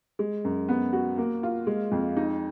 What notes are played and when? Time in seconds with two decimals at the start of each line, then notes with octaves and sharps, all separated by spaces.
0.19 G#3
0.44 F#2
0.68 B3
0.93 F#4
1.18 A#3
1.43 F4
1.67 G#3
1.92 F2
2.17 D#4